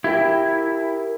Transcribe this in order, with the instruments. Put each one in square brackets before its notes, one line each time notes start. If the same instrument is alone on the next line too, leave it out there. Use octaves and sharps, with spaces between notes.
[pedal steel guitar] E4 [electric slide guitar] G4 A#4 G5